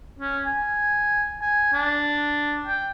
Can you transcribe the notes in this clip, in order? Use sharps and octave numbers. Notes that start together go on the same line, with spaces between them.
C#4
G#5
G#5
D4
G5